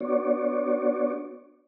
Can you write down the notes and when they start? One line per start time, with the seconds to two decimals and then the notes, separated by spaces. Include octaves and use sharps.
0.01 B3 D4 F#4 C#5 D5